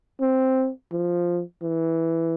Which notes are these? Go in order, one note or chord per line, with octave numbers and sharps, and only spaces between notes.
C4
F3
E3